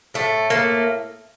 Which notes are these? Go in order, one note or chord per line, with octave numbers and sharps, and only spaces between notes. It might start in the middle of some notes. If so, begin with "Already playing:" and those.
A2 A3
A3 A#3